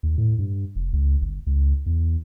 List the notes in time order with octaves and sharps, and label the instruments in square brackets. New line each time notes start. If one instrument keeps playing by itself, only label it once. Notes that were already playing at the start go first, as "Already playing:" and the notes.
[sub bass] D#2
A2
G2
F1
C#2
G1
C#2
E2